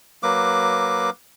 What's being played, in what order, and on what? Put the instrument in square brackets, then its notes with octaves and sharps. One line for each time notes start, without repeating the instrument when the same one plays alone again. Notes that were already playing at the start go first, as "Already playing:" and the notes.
[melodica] F#3 A#3 B4 D6